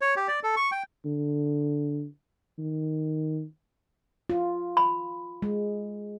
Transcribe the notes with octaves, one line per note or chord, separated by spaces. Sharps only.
C#5
G4
D5
A4
C#6
G5
D3
D#3
F4
B5
G#3